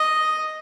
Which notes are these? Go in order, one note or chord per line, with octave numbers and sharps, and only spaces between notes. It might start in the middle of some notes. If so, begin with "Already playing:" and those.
Already playing: D#5